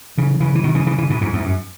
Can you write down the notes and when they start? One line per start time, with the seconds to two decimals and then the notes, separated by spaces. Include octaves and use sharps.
0.18 C#3 E3
0.40 C#3 E3
0.55 E3
0.64 B2 D#3
0.75 C#3 E3
0.86 C#3 E3
0.98 C#3 E3
1.10 G#2 B2
1.21 E2 G#2
1.33 E2 G#2
1.44 F#2